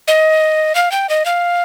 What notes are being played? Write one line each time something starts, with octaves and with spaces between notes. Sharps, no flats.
D#5
F5
G5
D#5
F5